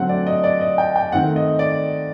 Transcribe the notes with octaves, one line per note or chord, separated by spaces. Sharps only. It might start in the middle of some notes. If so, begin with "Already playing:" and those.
Already playing: D3 F#3 A3 C4 F#5
D5
D#5
D5
D#5
G5
G5
D#3 A3 C4 F#5
D#5
D5